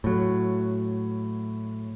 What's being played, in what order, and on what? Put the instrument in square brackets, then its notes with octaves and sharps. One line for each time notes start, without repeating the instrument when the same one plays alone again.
[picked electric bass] A2 F#3